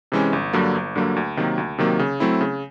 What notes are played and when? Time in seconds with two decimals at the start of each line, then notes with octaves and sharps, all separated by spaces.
0.12 C3 E3 G#3 C#4
0.33 G1
0.53 G2 D3 F#3 A#3
0.74 G1
0.95 G2 D3 F#3 A#3
1.16 D2
1.37 C3 D#3 F#3 A#3
1.58 D2
1.78 C3 D#3 F#3 A#3
1.99 C#3
2.20 F#3 A3 C4 E4
2.41 C#3